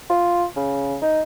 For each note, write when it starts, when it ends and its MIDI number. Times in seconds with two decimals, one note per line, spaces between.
0.10 0.44 65
0.56 0.96 49
1.01 1.22 63